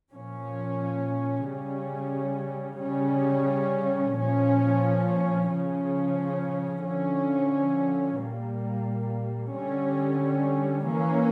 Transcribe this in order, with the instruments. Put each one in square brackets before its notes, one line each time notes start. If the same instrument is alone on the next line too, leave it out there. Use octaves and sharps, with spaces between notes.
[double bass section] A#2 F3 C#4
C#3 G3 C#4
C#3 G3 C#4
A#2 F3 C#4
C#3 F3 C#4
D3 F3 C#4
A#2 G3 A#3
D3 G3 C#4
E3 A#3 C#4